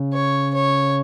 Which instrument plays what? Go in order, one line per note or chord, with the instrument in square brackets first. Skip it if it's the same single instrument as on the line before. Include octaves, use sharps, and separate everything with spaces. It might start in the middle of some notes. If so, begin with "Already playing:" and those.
Already playing: [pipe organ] C#3
[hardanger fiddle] C#5
C#5